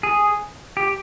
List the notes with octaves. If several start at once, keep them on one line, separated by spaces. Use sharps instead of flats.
G#4
G4